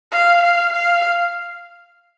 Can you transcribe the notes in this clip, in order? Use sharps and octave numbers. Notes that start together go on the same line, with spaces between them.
F5
F5
F5